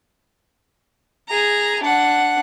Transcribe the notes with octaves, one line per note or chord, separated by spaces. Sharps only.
G#4 A#5
D4 F#5